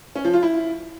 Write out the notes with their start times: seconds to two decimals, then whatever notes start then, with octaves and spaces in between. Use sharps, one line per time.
0.16 C#4
0.25 F3
0.34 F4
0.43 E4